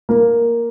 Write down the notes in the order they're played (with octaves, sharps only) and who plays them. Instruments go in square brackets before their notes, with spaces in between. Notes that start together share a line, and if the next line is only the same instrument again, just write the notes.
[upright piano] A#3